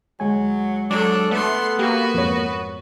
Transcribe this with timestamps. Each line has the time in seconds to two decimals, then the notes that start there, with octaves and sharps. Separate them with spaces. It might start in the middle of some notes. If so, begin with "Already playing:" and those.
0.20 D2 F#3 G#3 G#5
0.91 F#3 D4 A4
1.31 A3 B3 A4 C6
1.79 A#3 F#4 G4 B4
2.14 F2 G#2 C#5